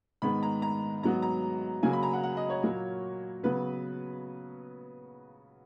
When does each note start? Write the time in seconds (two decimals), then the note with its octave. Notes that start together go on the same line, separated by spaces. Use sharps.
0.22 G#2 D#3 G#3 B3 B5
0.43 A#5
0.62 A#5
1.03 G#2 F#3 B3 A#5
1.22 A#5
1.83 C#3 F#3 A#3 G#5
1.93 B5
2.03 A#5
2.13 F#5
2.23 F#5
2.37 D#5
2.50 C#5
2.63 A#2 F#3 A#3
3.43 C#3 F#3 B3 B4